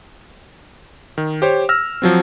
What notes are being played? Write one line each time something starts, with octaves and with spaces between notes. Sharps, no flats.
D#3
G4 C5 C#5
E6 F6 A#6
F3 F#3 C4